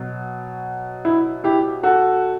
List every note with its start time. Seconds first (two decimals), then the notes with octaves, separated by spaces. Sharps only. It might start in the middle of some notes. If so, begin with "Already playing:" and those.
Already playing: B2 F#3
1.05 E4
1.44 E4 G4
1.83 F#4 A4